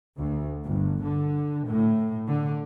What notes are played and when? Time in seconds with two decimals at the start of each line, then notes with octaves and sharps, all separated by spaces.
0.17 D2
0.64 G1
1.03 D3
1.66 A2
2.26 D3